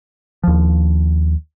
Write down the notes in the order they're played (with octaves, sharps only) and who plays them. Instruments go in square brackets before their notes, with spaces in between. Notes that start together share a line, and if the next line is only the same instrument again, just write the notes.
[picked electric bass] D#2 F3